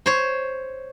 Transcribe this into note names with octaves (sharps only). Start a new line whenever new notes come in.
C5 C#5